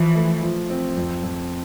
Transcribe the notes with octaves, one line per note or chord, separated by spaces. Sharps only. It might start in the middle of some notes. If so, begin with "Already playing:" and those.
Already playing: E3 F3
A3
F3
C4
F2
F2